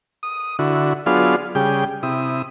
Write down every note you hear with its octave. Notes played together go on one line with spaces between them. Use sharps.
D#6
D3 E4 F#4
F#3 B3 D4 F4 G#4 F5
C#3 G3 G#4 G5
C3 E4 D#6